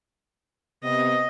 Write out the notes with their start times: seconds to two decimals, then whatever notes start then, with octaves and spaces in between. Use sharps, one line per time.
0.83 C3 B3 D#5